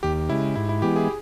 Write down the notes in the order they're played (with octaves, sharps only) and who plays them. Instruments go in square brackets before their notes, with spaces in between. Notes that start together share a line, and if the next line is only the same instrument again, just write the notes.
[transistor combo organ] D#2 [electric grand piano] G4
[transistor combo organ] C#3 G#3 [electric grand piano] E4
[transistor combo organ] G#2 [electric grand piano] E4
[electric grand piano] E4
[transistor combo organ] E3 G#3 B3 [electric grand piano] G4
[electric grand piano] G#4